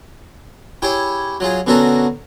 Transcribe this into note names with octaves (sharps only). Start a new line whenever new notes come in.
E4 G4 G#4 C#5 G5
F#3 F4 G#4
B2 D3 C#4 F#4 A4 A#4